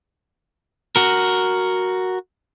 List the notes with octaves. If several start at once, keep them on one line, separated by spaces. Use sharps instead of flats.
F#4 A#4